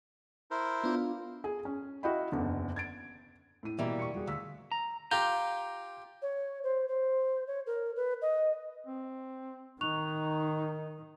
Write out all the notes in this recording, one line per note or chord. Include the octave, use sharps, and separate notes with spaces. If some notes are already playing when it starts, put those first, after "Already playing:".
E4 A#4 C5
B3 D4 F4
G#4
C#4
E4 F#4 D#5 F5 G5 B5
F#1 E2 D3
G#6 A6 D7
A2 D#7
B2 E3 G3 A#3 E5
C#6 C#7
G3 F#4 G#4
D2 F5 E6 B6
A#5
F4 G4 A#5 G6
C#5
C5
C5
C#5
A#4
B4
D#5
C4
D#3 D#4 C#6 F#6 F7